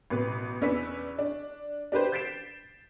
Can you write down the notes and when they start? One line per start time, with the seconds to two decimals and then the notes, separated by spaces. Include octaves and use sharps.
0.10 A1 B2 B4
0.61 E2 C#4 D4 B4 E6 B6
1.18 D4
1.92 D4 G4 B4 C5
2.12 G6 A6 B6 C7 D7 E7